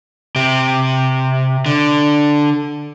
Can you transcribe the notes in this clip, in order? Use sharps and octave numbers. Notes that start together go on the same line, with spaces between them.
C3 G4
D3